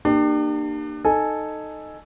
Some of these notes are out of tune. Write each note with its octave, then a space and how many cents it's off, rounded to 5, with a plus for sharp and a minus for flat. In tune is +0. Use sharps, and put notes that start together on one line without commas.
A#3 -10 D4 +35 G4 +0
D#4 -10 A4 +0 G#5 +0